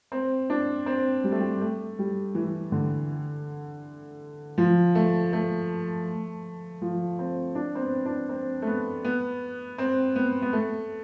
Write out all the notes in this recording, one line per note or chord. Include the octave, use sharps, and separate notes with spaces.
C4
D4
C4
G3
A3
G3
A3
G3
E3
D3
F3
A3
A3
F3
C4
D4
C4
B3
D4
C4
A3
B3
B3
C4
B3
B3
A3